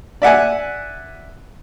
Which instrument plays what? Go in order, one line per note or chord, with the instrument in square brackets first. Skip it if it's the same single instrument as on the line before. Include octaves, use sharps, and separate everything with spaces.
[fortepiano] D5 E5 F#5 G#5